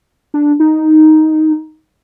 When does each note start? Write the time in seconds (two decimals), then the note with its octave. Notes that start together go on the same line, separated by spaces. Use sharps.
0.34 D4
0.60 D#4